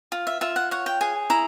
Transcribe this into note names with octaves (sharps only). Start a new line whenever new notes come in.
F4
E5
F4 E5
F#5
C#5 F#5
G5
G#4 G#5
E4 A#5